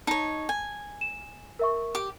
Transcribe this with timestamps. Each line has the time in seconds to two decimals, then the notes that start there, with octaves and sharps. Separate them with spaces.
0.07 D#4 C#5 A5
0.49 G#5
1.01 E7
1.59 A#4 E5 C#6
1.95 G4 D6